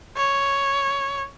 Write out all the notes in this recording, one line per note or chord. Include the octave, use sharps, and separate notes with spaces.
C#5